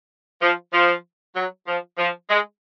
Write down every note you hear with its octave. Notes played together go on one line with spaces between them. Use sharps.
F3
F3
F#3
F3
F3
G#3